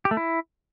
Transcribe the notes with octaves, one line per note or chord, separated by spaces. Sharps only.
G4
A3
E4